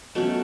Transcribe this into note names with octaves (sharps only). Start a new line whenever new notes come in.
B2 F#3 A3 C#4 A4